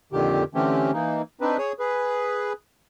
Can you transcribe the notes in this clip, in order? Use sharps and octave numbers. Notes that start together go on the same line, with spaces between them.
F2 A#2 D3 D#3 G4
D3 E3 A3 C4 C#4 G4
E3 A#3 D#4
C4 D4 D#4 B4
G#4 C#5 D#6
G#4 B4